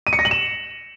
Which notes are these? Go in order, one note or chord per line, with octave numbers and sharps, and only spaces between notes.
D#7
C#7
A#6
F#7
E7